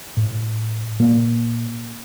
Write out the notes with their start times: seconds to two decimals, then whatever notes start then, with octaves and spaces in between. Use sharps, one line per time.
0.17 A2
0.99 A#2 A#3